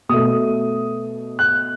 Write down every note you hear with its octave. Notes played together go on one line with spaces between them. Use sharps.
B2 A3 D#6
F#6